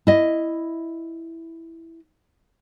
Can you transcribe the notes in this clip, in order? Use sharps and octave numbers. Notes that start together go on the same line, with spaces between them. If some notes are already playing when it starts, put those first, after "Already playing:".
E4 D#5